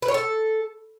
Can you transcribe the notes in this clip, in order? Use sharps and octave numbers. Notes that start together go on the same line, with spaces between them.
B4
C#5
A4